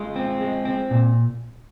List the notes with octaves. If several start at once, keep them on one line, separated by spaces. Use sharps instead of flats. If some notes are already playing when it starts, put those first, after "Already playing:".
Already playing: G#3 F4
C4
G#3
C4
A#2